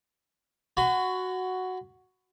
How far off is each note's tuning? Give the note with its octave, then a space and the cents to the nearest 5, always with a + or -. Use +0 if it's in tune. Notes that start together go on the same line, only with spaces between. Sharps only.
F#4 +0 G#5 +30 B5 +40